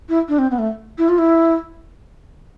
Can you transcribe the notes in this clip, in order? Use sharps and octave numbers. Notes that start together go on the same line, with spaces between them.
E4
D4
C4
B3
A3
E4
F4
E4